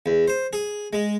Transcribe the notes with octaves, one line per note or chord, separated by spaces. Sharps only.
E2
C5
G#4
G#3